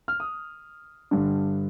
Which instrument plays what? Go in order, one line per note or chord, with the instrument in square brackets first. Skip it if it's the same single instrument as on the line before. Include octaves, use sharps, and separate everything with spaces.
[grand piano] F6
D#6
G2 D3